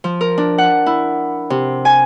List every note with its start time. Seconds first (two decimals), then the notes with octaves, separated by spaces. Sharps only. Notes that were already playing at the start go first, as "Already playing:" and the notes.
0.04 F3
0.21 A#4
0.38 D4
0.58 F#5
0.86 E4
1.50 C3
1.85 G#5